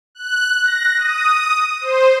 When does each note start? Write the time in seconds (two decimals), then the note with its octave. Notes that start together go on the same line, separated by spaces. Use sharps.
0.15 F#6
0.63 A#6
0.97 D#6
1.81 C5